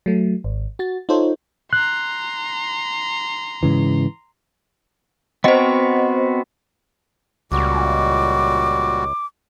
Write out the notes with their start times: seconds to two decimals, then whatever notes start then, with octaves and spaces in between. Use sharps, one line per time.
0.06 F#3 A3
0.44 G#1
0.79 F#4 A6
1.09 D#4 F4 A4 C5 C#5
1.73 A#5 C6 F#6
3.63 G#2 C#3 E3
5.44 B3 C4 F#4 C5 D#5
7.52 C#2 A#2 G3 F#4 D6